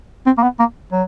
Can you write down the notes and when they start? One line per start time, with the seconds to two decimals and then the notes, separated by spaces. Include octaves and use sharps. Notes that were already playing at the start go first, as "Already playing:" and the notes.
0.26 C4
0.38 A#3
0.43 B3
0.59 A#3
0.92 F#3